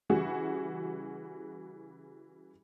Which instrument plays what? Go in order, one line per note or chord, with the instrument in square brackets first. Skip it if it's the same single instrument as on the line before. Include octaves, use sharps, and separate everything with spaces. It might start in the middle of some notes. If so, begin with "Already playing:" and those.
[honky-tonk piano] C#3 E3 G3 F#4 G#4